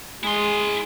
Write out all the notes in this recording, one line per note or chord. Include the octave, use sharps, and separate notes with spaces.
G#3 E4 G#4 C6